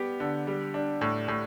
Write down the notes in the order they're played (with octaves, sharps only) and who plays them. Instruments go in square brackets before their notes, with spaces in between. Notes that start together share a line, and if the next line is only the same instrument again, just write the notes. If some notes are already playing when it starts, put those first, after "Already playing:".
Already playing: [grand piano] G3 B3 G4
D3
G3
D4
A2
A2